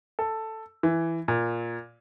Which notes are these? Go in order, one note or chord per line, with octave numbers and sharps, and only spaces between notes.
A4
E3
A#2